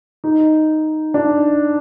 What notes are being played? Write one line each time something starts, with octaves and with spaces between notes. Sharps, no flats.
D#4
D4